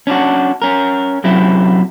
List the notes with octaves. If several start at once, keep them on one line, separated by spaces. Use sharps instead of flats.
C#4 D4 E4 F#4
C#4 A#4
F#2 C3 F#3 C4 E4